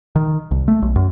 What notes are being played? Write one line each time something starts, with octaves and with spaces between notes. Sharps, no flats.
D#3
C2
A3
B1
F#2